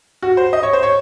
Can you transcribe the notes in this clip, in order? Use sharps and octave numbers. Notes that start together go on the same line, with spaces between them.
F#4
C5
D#5
C#5
C5
C#5